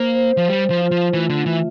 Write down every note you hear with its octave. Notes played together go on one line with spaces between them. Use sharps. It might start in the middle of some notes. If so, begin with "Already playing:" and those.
Already playing: A#3 C5
C5
F3
G3 C5
F3
F4
F3
E3 A3
D3
E3 E5